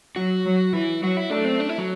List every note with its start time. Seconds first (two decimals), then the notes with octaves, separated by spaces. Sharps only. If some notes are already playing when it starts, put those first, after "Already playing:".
0.16 F#3 F#4
0.45 F#3
0.73 E3 E4
1.02 F#3 F#4
1.17 E4
1.30 A3 D4
1.45 C4
1.60 D4
1.69 E4
1.78 F#3